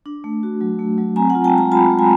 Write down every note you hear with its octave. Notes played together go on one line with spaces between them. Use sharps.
D4
A3
F#4
F#3
A3
F#3
C4 G#5 A#5
F#5 G#5
F4
G5 A5
G#3
G#5 A#5
F4 A5 B5
G#3
G#5 A#5